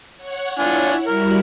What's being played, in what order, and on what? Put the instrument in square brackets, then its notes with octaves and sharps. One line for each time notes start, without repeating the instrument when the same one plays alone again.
[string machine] C#5 F#5
[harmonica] D4 F4 G#5 [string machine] E4 C#5 F#5
[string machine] G3 E4 F#4 [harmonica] A#4